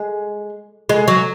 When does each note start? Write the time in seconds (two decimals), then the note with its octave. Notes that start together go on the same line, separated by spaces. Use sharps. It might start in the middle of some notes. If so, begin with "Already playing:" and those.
Already playing: G#3
0.89 G#3
1.08 F#3